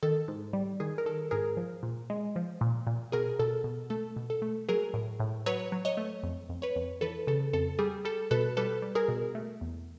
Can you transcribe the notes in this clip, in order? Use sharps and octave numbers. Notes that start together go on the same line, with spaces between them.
D#3 A4
G#2
G3
D#3 G#4
A#4
D#3 A4
G#2 G#4 A#4
F3
A#2
G#3
F3
A#2
A#2
B2 G#4 A#4
B2 A4
B2
A3 A4
B2
A4
A3
F#3 G#4 A#4
A2
A2
F#3 B4 C#5
F#3
C#5 D#5
A3
F2
F2
B4 C#5
F2
E3 A4 B4
C#3 A4
F2 A4
G3 G#4
G3 A4
B2 A4 B4
G3 A4 B4
G3
G#4 A#4
B2
A3
E2